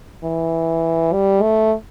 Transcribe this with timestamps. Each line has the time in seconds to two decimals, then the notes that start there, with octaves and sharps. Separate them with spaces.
0.24 E3
1.13 G3
1.42 A3